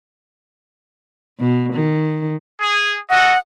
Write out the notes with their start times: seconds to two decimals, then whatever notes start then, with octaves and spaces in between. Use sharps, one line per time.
1.40 B2
1.74 D#3
2.61 G#4
3.10 F#4 A4 D#5 F#5